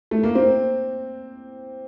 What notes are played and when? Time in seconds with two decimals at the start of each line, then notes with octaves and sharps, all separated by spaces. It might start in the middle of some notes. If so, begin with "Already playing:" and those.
0.11 A3
0.23 A#3
0.35 C4